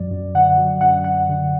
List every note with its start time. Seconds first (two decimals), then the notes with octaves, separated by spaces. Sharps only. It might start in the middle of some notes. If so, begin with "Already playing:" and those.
Already playing: F#2 F#3 D5
0.11 F#2
0.35 D3 F#5
0.57 F#3
0.81 F#2 F#5
1.04 F#2 F#5
1.29 D3